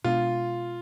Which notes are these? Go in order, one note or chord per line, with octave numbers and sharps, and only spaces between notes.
B2 G#3 B3 D4 F4